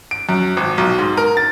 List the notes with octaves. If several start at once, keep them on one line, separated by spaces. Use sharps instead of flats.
D7
F#2
G#1
B1
G#2
A#4
A6